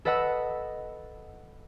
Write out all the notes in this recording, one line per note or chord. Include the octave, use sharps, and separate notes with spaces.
A4 B4 D#5 F#5 E6